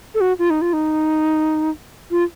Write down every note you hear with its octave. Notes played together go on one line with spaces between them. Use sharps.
A4
F#4
F4
D#4
F4
D#4
F4